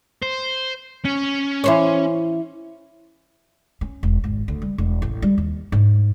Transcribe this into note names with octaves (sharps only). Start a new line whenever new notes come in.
C5
C#4
E3 C5 C#5
C#4
E1
G#1
D2
G3
E1
A1
G3
D#2
G#2